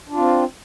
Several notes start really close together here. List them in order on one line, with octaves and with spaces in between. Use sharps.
D4 F4 C4